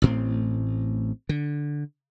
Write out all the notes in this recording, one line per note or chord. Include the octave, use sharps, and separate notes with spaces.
A1 A2 C4
D3